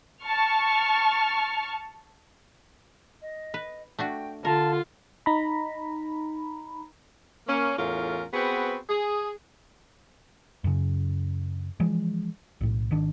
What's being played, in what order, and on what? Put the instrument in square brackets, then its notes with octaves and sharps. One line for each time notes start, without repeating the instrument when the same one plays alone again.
[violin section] A5 C#6 F6
[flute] D#5
[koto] B4
[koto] A3 D4 F#4 [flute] G5
[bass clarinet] D3 [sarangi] F4 [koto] A#4 [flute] A5
[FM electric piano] D#4 A#5 B5
[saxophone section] A#3 C#4
E2 A2 C#4 F4 A#4
B3 C4 F#4 G#4 B4
G#4
[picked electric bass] F#2 C#3
E3 F3 G#3
B1 A2
G#1 D#3 D4